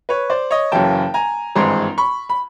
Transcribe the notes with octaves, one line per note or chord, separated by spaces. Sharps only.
B4 C#5
C5 D5
C#5 D#5
F#1 F#2 C#3 E3 G5 A5
G#5 A#5
G#1 G2 E3 G#3 C4 A#5 C6
B5 C#6
B5